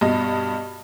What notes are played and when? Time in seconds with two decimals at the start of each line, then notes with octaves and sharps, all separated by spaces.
0.01 G2 B2 D#5